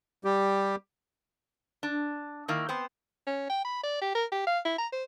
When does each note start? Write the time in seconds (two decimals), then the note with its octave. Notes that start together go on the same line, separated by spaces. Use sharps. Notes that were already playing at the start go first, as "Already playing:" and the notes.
0.24 G3 G4
1.83 D4
2.48 D#3 A#3 E4
2.69 B3 C4 C5
3.27 C#4
3.50 G5
3.65 B5
3.84 D5
4.02 G4
4.15 A#4
4.32 G4
4.47 F5
4.65 E4
4.79 A#5
4.92 C5